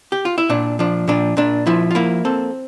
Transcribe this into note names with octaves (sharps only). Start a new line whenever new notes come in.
G4
F4
E4
A#2 D4
F3 D4
A#2 D4
A#2 D4
F3 E4
F4
A#3 E4
C4 A4